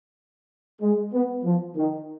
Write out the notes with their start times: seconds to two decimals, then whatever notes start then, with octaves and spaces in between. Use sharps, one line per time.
0.82 G#3
1.13 B3
1.44 F3
1.76 D#3